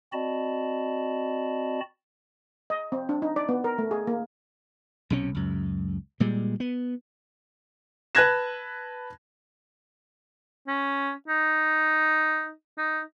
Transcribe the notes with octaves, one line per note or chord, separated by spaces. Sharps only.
C4 F#4 D5 D#5 A5 B5
D#5
C4
D4
D#4
D5
B3
A#4
A3
G#4
A#3
B1 C3 C#4
C#2 F#2
A#2 G3 G#3
B3
B4 A5 F#6 G#6 A#6 E7
C#4
D#4
D#4